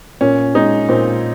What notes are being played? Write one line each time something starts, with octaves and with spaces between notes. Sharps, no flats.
A#2 C#4
G#3 D#4
A#2 C4